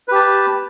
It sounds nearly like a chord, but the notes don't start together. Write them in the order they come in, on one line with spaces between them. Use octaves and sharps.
B4 G4 A5